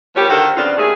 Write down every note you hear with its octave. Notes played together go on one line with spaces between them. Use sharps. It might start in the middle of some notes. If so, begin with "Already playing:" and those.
F3 G3 A#3 B3 G4 C#5
D3 D#3 A#3 F#4 A4 C5
F2 C#3 B3 C4 D4 F4
D#2 A3 G#4